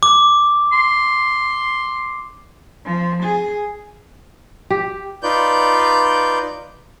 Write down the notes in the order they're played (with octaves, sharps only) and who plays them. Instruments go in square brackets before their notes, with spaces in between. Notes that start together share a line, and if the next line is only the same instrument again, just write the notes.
[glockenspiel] D6
[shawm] C6
[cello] F3
G#4
[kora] G4
[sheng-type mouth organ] D#4 F4 B4 D5 G6